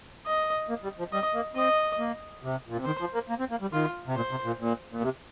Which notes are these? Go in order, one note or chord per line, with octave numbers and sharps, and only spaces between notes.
D#5
A#3
G3
F3
G3 D#5
A#3
C4 D#5
A#3
C3
A#2
C3
D#3 C5
F3
A#3
A#3
C4
A#3
G3
D#3 F4
C3
A#2 C5
C3
A#2
A#2
A#2
C3